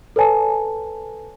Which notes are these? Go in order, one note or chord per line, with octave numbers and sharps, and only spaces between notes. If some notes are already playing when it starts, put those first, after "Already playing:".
A4 B4 C#5 G#5 A5